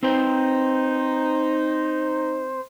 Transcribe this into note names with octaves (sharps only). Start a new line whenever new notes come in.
C4 D#4 B4 C5 G5